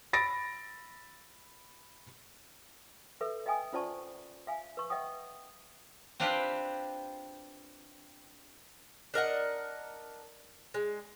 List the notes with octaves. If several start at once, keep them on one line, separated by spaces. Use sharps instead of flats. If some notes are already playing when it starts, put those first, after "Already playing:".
B5 A6 A#6 D7
A4 B4 E5
D#5 E5 G5 G#5 D#6
C#4 F4 C5 D5 A5 C#6
E5 F5 G#5
B4 C#6
D#5 E5 F#5 G5 D#6
C4 D4 F4 G4 B4 C5
D4 A#4 D#5 F#5
G#3